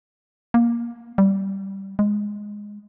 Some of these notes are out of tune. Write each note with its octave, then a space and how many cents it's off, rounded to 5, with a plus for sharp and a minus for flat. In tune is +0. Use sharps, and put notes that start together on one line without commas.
A#3 +15
G3 -10
G#3 -5